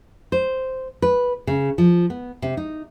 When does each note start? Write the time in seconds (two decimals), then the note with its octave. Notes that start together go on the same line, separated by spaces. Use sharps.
0.32 C5
1.02 B4
1.47 C#3
1.78 F3
2.10 B3
2.42 C3
2.57 D#4